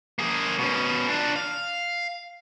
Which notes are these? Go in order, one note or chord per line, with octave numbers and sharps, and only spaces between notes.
A#3 G#4
B2 C#4
D4 F4
F5